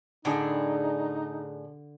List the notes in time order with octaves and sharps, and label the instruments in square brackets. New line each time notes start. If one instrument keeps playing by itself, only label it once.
[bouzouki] A2 D4 G#4 [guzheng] D3 [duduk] D#4